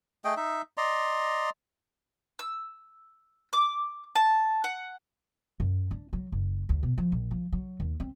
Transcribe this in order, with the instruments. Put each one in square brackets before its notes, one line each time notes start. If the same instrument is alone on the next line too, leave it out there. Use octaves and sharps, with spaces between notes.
[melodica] A3 G#4 D#5 G5
D#4 E5
D5 D#5 A#5 C6
[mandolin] E6
D6
A5
F#5
[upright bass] F#2
D4
F#3
F#1
D2
B2
F3
A#1
F3
F#3
D#2
C4